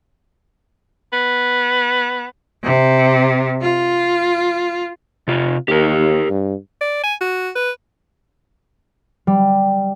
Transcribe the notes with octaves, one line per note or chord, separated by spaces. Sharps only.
B3
C3
F4
C3 F4
D#2 G4 A#4
G2
D5
G#5
F#4
B4
G3